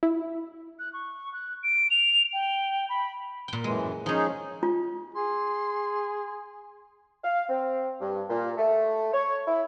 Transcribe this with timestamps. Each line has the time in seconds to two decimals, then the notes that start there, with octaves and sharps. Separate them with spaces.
0.03 E4
0.79 F#6
0.93 C#6
1.33 F#6
1.63 D7
1.91 F7
2.33 G5
2.89 B5
3.48 A#2 G5
3.64 F#2 A2 E3 G#3
4.06 F3 C#4 D#4 G#4
4.63 F4
5.15 G#4 C6
7.24 F5
7.49 C4
8.01 G2
8.30 A#2
8.57 A3
9.13 C#5
9.47 E4